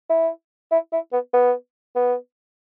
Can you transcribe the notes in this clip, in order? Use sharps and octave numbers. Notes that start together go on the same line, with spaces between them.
E4
E4
E4
B3
B3
B3